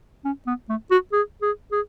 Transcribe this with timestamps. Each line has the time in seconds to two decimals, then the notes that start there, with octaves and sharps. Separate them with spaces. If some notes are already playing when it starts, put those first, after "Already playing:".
0.25 C#4
0.47 B3
0.69 A3
0.91 F#4
1.13 G#4
1.42 G#4
1.72 G#4